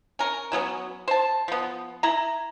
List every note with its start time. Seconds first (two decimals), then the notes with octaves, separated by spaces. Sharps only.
0.19 C#4 A#4
0.52 E3 F#3 B3 C#4
1.08 C5 A5
1.48 F3 B3
2.03 E4 A#5